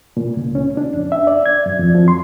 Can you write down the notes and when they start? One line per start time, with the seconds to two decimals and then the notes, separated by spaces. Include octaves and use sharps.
0.17 A#2
0.37 C#2
0.55 C#4
0.77 D4
0.93 F2
1.12 E5
1.27 D5
1.46 G#6
1.66 F#2
1.79 F2
1.95 F3
2.08 C6